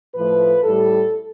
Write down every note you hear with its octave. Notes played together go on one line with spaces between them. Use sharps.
A2 F3 A3 B4
A2 G3 A4